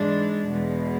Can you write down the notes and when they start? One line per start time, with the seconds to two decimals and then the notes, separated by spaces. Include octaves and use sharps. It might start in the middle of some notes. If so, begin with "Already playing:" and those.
Already playing: G#2 E3 G#3 D4
0.47 E2 B2 G#3